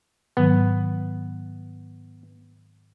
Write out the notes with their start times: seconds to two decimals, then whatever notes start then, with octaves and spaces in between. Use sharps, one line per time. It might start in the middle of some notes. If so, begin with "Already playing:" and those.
0.37 G#2 D#3 F#3 B3